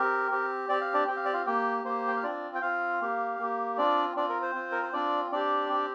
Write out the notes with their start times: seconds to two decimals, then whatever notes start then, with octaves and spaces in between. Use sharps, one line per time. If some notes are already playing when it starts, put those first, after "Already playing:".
Already playing: C4 G4 A#4
0.31 C4 G4
0.69 C4 G4 D5
0.81 F5
0.94 D4 D5
1.08 C4 G4 G5
1.16 F5
1.25 D5
1.33 F4 F5
1.46 A#3 G4 G5
1.84 A#3 G4 C5
2.08 G5
2.16 F5
2.23 C4 D4 F4 D5
2.55 G5
2.62 C4 F4 F5
3.01 A#3 G4
3.39 A#3 G4
3.78 C4 D4 F4 D5
4.16 C4 D4 F4 D5
4.29 A#4
4.42 C5
4.55 C4 F4
4.72 A#4
4.83 C5
4.93 C4 D4 F4 D5
5.32 C4 D4 G4 D5
5.70 C4 G4